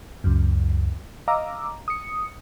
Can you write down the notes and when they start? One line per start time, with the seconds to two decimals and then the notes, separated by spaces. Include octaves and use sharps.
0.24 C#2 F#2
1.28 D#5 F5 A#5 D6 E6
1.88 D#6 C#7